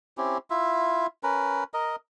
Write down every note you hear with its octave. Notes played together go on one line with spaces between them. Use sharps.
C4 C#4 E4 G4
E4 F4 E5
C#4 A#4 B4
A#4 D#5